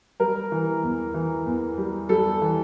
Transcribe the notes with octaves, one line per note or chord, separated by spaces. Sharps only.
G3 A#4
E3
E2
E3
E2
G3
G3 A4
E3